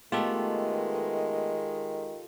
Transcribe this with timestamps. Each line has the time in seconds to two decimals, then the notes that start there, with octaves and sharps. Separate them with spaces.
0.12 D#3 G#3 A3 B3 F4 G4 A4